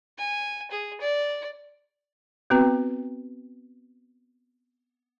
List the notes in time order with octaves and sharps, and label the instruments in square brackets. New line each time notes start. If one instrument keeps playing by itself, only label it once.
[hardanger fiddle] G#5
G#4
D5
[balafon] B3 C4 F#4 B4 A#5